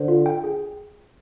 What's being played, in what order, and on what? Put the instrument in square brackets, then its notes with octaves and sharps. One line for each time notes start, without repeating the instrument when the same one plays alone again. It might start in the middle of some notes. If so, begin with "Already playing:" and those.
Already playing: [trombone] D3 [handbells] C5
[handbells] F4
G5
G#4